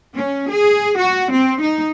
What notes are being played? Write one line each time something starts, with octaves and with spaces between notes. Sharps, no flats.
C#4
G#4
F#4
C4
D#4